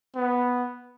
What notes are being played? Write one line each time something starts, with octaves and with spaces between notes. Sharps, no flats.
B3